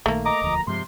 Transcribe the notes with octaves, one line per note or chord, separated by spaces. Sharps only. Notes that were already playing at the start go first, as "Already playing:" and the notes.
A#1 D#3 A3 A#3
D#5 A#5 D6 D#6
E1 D2 F3
G2 C3 F3 G#3 C6